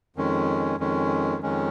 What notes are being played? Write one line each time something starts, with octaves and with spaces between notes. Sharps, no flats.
F2 D#3 G#3 C#4
F2 D#3 G#3 C#4
F2 D#3 G#3 C#4